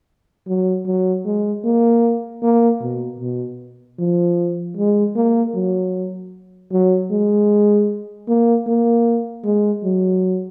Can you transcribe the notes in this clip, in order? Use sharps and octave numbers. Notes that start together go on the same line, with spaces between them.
F#3
F#3
G#3
A#3
A#3
B2
B2
F3
G#3
A#3
F#3
F#3
G#3
A#3
A#3
G#3
F#3